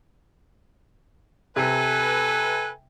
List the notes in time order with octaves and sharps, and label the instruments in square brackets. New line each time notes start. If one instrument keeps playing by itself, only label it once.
[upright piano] C3 [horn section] A4 B4 [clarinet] G#5